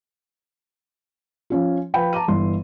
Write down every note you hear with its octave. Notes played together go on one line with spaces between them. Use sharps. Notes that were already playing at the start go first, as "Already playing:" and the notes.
F3 C#4 F4
F3 B4 G5 B5
A5 A#5 D6 D#7
G1 E3 C6